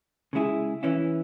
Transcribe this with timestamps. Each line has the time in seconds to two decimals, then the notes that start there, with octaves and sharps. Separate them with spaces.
0.33 C#3 G#3 E4 G#4
0.83 E3 C#4 E4